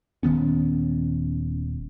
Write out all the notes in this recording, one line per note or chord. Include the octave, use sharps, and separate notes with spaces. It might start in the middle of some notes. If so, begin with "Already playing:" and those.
D#1 D#3 B3 C#4